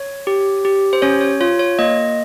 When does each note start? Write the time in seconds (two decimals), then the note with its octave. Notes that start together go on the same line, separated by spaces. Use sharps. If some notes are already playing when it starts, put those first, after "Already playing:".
Already playing: C#5
0.27 G4
0.65 G4
0.93 C5
1.02 C#4 C#5
1.21 C#5
1.41 F4 C#5
1.59 C#5
1.79 A#3 D#5